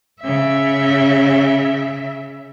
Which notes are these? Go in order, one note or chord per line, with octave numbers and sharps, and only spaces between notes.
C#3 E5